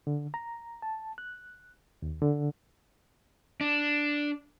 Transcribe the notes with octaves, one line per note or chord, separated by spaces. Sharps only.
D3
A#5
A5
F#6
D#2
D3
D4